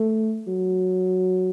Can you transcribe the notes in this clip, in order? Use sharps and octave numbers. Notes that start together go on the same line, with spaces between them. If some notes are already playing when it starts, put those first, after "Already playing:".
Already playing: A3
F#3